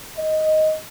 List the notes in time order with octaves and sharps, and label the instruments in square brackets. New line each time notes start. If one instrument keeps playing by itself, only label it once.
[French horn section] D#5